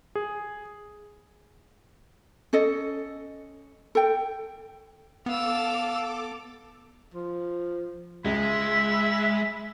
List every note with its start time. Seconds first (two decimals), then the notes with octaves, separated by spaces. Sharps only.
0.15 G#4
2.53 C#4 A4 D#5
3.95 A4 G5
5.26 B3 A4 F5 D6 E6
7.14 F3
8.25 C#2 G#3 E5 B5